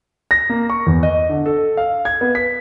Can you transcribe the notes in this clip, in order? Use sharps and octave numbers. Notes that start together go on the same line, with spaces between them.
A#6
A#3
C#6
E2
D#5
D3
A4
F5
G#6
B3
B6